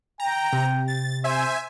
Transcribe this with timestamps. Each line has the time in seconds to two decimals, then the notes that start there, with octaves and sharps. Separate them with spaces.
0.20 G5 A#5 A#6
0.53 C3
0.88 A6
1.24 C5 E5 G#5